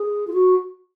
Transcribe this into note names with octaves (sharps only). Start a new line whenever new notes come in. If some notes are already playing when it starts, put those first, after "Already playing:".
Already playing: G#4
F4
F#4